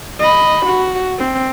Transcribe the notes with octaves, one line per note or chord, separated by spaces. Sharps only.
D#5 B5
F#4
C4